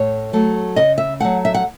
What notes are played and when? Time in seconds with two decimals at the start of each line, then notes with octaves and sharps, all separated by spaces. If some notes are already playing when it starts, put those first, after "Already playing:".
Already playing: A2 C#5
0.33 F#3 A3
0.76 C#3 D#5
0.98 E5
1.20 F#3 A3 F#5
1.45 E5
1.54 F#5